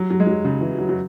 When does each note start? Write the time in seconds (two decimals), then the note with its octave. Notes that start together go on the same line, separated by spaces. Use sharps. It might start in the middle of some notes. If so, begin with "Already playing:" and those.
Already playing: F#3
0.10 F#3
0.20 G#3
0.27 F#3
0.45 C#3
0.61 E3
0.78 F#3
0.89 F#3